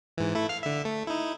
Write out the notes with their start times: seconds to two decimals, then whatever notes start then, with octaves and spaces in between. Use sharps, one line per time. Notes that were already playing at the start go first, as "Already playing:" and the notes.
0.18 G#2 E3
0.35 A3 E4
0.49 F5 F6
0.63 D3 E5
0.85 A3
1.07 D#4 E4